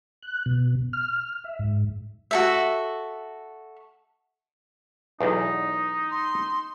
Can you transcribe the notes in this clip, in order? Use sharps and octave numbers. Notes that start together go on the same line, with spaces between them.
F#6
B2
F6
E5
G#2
F#4 A4 E5
B1 E2 D#4
C6